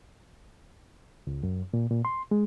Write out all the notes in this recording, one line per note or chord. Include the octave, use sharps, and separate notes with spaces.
C#2
F#2
A#2
A#2
C6
G#3